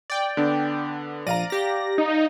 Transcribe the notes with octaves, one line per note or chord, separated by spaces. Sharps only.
D5 G5
D3 B3 D4
A#1 D5 F5 A#5 A#6 D#7
G4 A#6
D#4